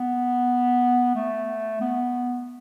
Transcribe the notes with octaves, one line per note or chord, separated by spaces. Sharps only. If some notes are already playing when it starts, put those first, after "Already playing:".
Already playing: B3
A3
B3